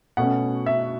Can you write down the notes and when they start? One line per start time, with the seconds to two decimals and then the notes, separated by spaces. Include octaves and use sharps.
0.17 B2 A3 C#4 F#5
0.66 E5